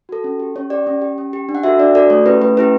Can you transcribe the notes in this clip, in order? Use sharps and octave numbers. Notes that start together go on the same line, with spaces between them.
F#4 A4
C#4
G4
C#4 C#5
G4 D5
C#4
G4
C#4
G4
D4
F#5
F#4 A4 E5
D4 D5
F#4 A4 D5
A3 C#5
C#4 E4 G4 B4
A3 B4
C#4 E4 G4 B4